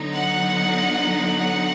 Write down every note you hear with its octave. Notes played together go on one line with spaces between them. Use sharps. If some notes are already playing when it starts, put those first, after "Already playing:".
Already playing: D3 F#3 B3 D#4
F#5
F#5